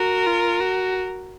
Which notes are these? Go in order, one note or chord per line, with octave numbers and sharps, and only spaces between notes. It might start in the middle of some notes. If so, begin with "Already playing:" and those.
Already playing: F#4 A#4
F4
F#4